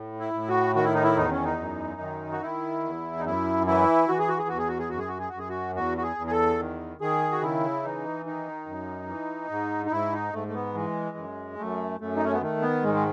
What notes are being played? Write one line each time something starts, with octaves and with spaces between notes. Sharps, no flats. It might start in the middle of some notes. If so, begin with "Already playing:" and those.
Already playing: A2
E4
A2
F#4
D#3 F#4
E4
D#4
E4
E2 D#4
C#4
D#4
F#2
D#3
F#4
D#3 E4
E2
D#4
F#2 E4
E3 E4
E3 F#4
G#4
F#4
G#4
E2 F#4
G#4
F#4
G#4
F#2 F#4
G#4
F#4
G#4
F#2 F#4
G#4
F#4
E2 F#4
F#4
G#4
E2
G#4
A4
D#3
D#3 G#4
F#4
C#3 E4
E3 D#4
D#3 D#4
F#2
E3
G#2
D#4
G#2 E4
D#4
G#2 A3
A3
B3
E3 G#3
F#2
F#2 A3
F#2 A3
D#4
C#4
B3
D#3 A3
B3
G#2 G#3
G#3